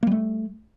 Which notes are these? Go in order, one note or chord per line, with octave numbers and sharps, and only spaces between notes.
G3 A3 A#3